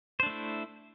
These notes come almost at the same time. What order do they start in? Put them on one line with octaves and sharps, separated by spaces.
C5 D4 A3 E4